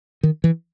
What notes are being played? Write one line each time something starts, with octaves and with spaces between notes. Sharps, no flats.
D#3
E3